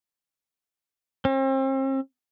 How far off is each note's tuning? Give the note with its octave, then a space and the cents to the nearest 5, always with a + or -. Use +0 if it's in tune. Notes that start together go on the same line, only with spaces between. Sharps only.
C4 +40